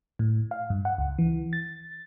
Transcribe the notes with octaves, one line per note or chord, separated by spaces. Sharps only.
A2
F5
G2
F#5
C#2
E3
A6